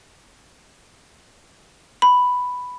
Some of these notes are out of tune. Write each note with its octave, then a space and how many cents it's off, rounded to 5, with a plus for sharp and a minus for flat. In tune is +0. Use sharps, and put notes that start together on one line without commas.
B5 +5